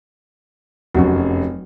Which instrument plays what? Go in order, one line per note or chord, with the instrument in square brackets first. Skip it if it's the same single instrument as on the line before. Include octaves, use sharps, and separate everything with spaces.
[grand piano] F1 F#2 [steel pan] F#3 F#4